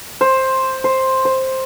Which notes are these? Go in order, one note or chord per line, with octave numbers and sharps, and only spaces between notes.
C5
C5
C5